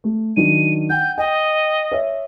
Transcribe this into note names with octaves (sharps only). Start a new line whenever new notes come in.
A3
D#3 F#3 D4 D#7
F#5 G5 G6
D#5 G5
C#5 E5